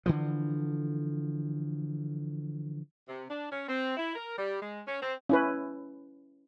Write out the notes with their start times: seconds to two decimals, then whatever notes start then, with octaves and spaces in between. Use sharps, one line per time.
0.06 D3 E3 F3
3.09 C3
3.30 D4
3.51 C#4
3.68 C4
3.97 E4
4.15 A#4
4.38 G3
4.62 G#3
4.87 C#4
5.02 C4
5.29 C#4 E4 B4